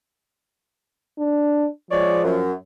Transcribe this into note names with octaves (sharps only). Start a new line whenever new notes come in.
D4
F3 G#3 C#5 D5
F#2